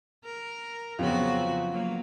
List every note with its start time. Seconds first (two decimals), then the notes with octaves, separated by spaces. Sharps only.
0.24 A#4
0.99 F2 C#3 F#3 B3 C4 F4 F#4
1.72 F#3 A#3